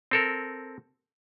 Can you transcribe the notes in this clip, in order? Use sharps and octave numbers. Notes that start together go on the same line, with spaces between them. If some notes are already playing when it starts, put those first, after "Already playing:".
C4 A4 A#4